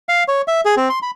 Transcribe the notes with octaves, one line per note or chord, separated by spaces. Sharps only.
F5
C#5
E5
G#4
C4
C6
B5